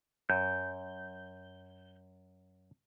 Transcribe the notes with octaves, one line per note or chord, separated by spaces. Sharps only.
F#2 G6